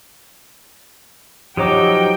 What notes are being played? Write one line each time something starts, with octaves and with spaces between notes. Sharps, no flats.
F3 F#3 D#4 G4 C#5 G5 D6